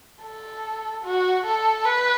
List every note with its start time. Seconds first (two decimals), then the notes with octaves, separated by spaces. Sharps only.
0.24 A4
1.04 F#4
1.46 A4
1.85 B4